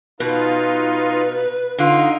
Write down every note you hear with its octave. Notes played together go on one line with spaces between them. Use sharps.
B2 D#4 F4 B4
D3 D#4 F4